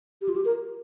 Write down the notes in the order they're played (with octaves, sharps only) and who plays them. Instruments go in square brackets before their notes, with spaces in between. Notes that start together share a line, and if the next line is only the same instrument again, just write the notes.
[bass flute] G4
F4
G4
A#4